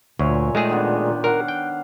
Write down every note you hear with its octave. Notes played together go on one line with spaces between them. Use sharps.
D2 A#2 C#5 E5 G#5
D#3 G#3 A3 G#4
D#3 B3 D4
A#4 F5 F#5
G5